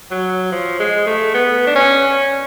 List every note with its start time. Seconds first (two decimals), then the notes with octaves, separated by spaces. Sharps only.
0.11 F#3
0.52 F3
0.79 G#3
1.07 A3
1.34 B3
1.67 D4
1.75 C#4